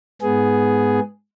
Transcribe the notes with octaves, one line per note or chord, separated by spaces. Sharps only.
G#2 B3 G#4